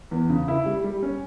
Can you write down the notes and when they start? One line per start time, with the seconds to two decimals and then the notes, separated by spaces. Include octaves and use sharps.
0.11 E2
0.30 C#3
0.48 E4
0.66 G3
0.84 G3
1.03 C#4